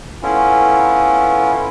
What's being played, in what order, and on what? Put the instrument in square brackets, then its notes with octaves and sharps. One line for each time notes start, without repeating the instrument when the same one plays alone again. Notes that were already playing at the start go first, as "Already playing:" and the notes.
[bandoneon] A3 B3 C#4 E4 F4